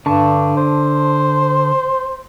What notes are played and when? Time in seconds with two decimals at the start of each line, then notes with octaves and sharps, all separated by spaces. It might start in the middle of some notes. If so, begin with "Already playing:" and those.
0.06 G2 D3 A5 C#6
0.57 C5